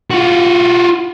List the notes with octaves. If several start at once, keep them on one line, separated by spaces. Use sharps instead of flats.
F4 F#4